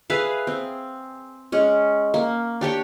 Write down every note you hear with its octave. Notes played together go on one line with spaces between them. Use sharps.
G#4 B4 E5 F5
C4
G#3 C#4
A#3
D4 G4 C#5 G5